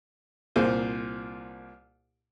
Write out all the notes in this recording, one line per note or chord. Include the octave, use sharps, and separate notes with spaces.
C2 A#2 C5